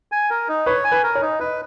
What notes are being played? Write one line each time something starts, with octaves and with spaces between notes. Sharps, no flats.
G#5
A#4
D#4
B4 C#5
G#5
B4
A#4
C#5
D#4
B4 D#5